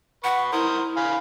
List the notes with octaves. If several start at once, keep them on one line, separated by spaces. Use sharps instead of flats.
B4 F#5 C#6
E4 A#4 C5 D#6
F5 G#5 B5